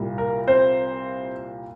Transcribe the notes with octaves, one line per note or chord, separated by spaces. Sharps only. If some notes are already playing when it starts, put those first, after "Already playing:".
Already playing: C2 A#2 G3 A#3
A#4
C4 C5